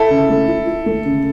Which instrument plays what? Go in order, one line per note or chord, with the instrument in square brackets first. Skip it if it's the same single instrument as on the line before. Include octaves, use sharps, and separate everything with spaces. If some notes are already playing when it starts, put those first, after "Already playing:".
Already playing: [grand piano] E4 A4
[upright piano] C#3
A3
E4
E4
A3
C#3